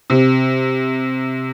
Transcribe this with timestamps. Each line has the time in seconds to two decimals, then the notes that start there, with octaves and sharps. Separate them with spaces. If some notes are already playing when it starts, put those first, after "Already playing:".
0.10 C3